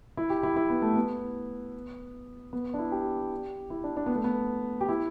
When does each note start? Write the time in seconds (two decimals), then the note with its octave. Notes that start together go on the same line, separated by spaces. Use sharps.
0.17 E4
0.30 G4
0.43 E4
0.56 E4
0.70 B3
0.82 A3
0.95 B3
2.53 B3
2.74 D4
2.79 E4
2.92 G4
3.70 E4
3.84 D4
3.97 D4
4.06 B3
4.15 A3
4.24 B3
4.81 G4
4.89 E4